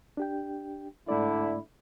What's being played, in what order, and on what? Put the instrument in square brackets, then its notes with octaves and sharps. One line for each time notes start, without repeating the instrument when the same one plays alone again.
[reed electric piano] D4 G4 G5
[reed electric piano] G#2 A3 D5 [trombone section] D3 E4